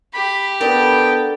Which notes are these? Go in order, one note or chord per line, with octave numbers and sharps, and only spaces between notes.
G4 B5
B3 D4 A4 A#4 G5